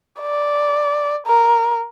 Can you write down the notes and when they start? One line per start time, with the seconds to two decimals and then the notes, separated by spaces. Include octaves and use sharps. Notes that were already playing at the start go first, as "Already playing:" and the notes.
0.21 D5
1.27 A#4